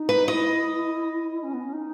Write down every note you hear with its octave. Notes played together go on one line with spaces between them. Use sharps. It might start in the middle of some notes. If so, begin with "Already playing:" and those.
Already playing: D#4
B4
E4 F#4 D#5
C#4
B3
C#4
D#4